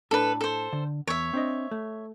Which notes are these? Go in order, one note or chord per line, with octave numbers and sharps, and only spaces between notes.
A2 D4 A4 B4
A4 C5
D3
E2 C#5 E5
C4 D4 D#5
A3